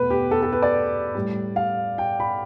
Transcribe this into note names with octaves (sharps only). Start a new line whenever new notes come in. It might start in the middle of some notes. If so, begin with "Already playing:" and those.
Already playing: E2 B2 A3 B4
G4
A4
A4
B4
D5
A2 G3
F5
G5
B5